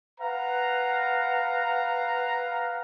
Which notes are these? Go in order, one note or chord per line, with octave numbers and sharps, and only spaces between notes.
B4 F5 F#5 A#5